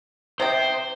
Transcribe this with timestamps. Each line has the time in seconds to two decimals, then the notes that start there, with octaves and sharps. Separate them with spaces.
0.40 C3 C5 D#5 G5